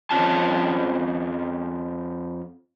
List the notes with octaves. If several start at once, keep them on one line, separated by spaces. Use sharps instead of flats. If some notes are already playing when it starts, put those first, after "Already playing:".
F2 C3 C4 C#4 F4 A5